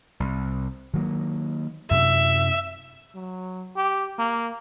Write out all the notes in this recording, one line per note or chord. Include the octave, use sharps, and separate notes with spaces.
C2
D#3 F#3 A#3
F#2 C3 E5
F#3
G4
A#3